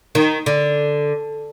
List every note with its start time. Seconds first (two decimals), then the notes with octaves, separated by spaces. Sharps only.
0.15 D#3
0.46 D3